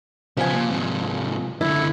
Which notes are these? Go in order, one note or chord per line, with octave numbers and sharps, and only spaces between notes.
C#3 F3 B3 G#5
A#2
G#2 C3
F#2 D3 E4